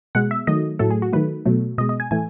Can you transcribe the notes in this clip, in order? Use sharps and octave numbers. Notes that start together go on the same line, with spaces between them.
B2 G#3 F#5
E5
D#3 F#3 A3 D#5
A2 F#3 A3 A4
G#4
F#4
D#3 F#3 A3 B4
B2 F#3 A3
B2 G#3 D#5
D#5
G#5
A2 E3 A3 G#5